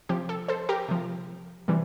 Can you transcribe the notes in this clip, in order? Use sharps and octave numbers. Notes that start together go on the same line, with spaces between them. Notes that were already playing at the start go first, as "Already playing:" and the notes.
C3 F3 G4
A4
A4 C5
G4 A#4
C3 F3
C3 E3 G3